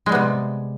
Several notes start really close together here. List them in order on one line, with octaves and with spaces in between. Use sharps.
G#3 G3 B3 C3